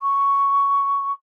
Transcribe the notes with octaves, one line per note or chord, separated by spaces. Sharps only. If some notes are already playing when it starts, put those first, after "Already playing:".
C#6